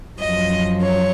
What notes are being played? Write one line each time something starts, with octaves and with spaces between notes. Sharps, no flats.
F#2 F3 D#5
C#5